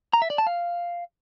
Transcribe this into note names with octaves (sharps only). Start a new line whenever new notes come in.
A#5
E5
D5
A5
F5